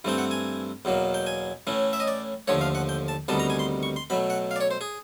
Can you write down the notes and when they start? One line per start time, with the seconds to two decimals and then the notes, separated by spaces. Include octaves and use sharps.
0.04 G2 E3 A3 C4 G5
0.18 F#5
0.31 G#5
0.85 E2 B2 F#3 A#3
1.14 G5
1.27 G#5
1.67 A2 E3 A3 C#4
1.93 E5
2.00 D#5
2.07 D5
2.48 D#2 D3 F3 A3 C#5
2.61 F5
2.75 F#5
2.89 G5
3.08 A5
3.28 D2 C3 D#3 G3 B3 A5
3.40 A#5
3.50 G#5
3.59 C6
3.83 C#6
3.96 C6
4.10 B2 F#3 A3 B5
4.30 F#5
4.51 F5
4.56 D5
4.61 C#5
4.71 C5
4.81 G#4